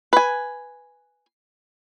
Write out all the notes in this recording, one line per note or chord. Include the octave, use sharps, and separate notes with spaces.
B4 G#5